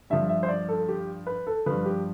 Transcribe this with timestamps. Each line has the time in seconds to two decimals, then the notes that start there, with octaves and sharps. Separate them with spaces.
0.10 G2 F3 E5
0.29 E5
0.43 C5
0.49 D5
0.69 A4
0.89 G4
1.27 B4
1.47 A4
1.66 G2 F3 B4
1.86 G4